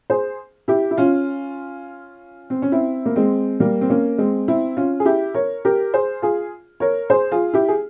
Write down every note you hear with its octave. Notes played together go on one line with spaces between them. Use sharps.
G#4 C5
E4 G4
E4
C#4 F4
C4
C#4
C4 E4
A#3
G#3 C4
G3 A#3
C4
A#3 C#4
G#3 C4
C4 E4
C#4 F4
G#4
E4 G4
A#4 C#5
G4 A#4
G#4 C5
F4 G#4
A#4 C#5
G#4 C5
F4 G#4
E4 G4
G#4